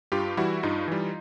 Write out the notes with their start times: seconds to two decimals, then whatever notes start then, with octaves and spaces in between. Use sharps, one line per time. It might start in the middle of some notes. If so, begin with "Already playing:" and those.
0.12 G2 F4 G4
0.37 E3 G3 E4 F#4
0.63 G2 D#4 F4
0.88 E3 G3